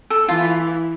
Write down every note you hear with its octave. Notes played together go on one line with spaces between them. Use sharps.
A4
E3 F4